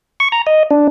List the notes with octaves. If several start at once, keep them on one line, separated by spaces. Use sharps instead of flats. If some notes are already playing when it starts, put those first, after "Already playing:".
C#6
A#5
D#5
D4